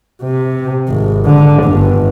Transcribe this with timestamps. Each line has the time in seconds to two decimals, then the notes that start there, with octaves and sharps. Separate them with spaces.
0.22 C3
0.89 G#1
1.26 D3
1.64 G1